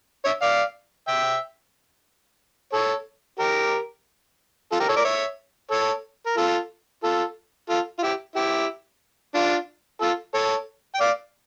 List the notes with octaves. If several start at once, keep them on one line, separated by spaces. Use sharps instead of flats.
C#5 E5
D5 F5
E5 G5
A4 C#5
G4 A#4
F4 A4
G4 A#4
A4 C#5
A#4 D5
C#5 E5
A4 C#5
A#4
F4 A4
F4 A4
F4 A4
F4
E4 G4
E4 G4
D4 F4
F4 A4
A4 C#5
G5
D5 F5